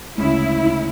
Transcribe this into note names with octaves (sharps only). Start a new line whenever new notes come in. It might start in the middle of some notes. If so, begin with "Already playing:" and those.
D2 C#3 G#3 C#4 E4